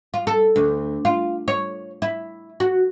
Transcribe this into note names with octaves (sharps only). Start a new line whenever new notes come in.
F4
A4
D2
F4
C#5
E4
F#4